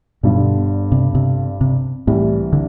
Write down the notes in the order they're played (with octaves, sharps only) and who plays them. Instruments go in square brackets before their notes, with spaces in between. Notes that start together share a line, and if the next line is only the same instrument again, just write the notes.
[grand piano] G1 G2 D3 [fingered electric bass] B2
[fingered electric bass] C3
C3
C3
[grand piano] C2 C3 E3 G3 [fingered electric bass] A2
[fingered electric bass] D3